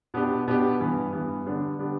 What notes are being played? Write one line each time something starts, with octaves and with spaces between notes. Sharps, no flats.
B2 B3 D4 G4
B2 B3 D4 G4
G2 E3 B3
G2 E3 B3
D3 G3 B3 D4 G4
D3 G3 B3 D4 G4